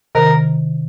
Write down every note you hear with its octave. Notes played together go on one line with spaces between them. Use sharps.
C3 D#3 A#4